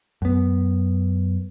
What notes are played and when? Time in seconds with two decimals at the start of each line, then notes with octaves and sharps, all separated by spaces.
0.22 F#2 B3